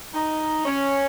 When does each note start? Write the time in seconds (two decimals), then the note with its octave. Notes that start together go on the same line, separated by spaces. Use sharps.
0.14 D#4
0.65 C#4